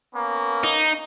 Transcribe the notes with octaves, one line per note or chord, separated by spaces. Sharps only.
A#3 B3 C#4
D#4